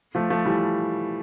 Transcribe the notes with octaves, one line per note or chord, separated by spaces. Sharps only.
F3 A3
F3 A3
E3 G3